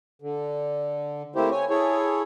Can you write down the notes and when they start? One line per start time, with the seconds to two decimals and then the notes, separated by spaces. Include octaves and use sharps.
0.22 D3
1.36 A3 A#3 C4 E4 G4 C5
1.51 C#5 G#5
1.70 E4 G#4 A4 C#5